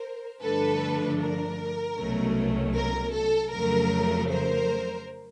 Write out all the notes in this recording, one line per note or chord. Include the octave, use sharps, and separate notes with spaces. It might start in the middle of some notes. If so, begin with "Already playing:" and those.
Already playing: A#4 C5
G2 D3 F3 A3 D4 A4 B4
A#4
C2 B2 F#3 A3 C#4
A#4
A4
F2 C#3 F#3 A3 A#4
A#4 C5